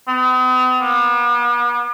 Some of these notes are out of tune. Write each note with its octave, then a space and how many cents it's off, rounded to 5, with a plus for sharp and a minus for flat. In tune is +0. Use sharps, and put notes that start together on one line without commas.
B3 +45
B3 -45